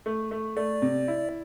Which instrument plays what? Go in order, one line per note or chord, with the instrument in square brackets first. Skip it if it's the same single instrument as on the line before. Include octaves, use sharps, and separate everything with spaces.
[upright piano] A3
A3
[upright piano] A3 [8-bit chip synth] D5
[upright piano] C3
E4